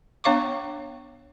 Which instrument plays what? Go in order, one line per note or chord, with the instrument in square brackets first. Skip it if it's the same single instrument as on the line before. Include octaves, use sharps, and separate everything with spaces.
[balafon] B3 D4 C#5 F5 C#6 D6